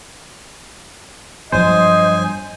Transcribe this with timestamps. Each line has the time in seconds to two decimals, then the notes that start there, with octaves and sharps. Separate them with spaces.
1.52 G2 F3 F#3 C5 D#5 G#5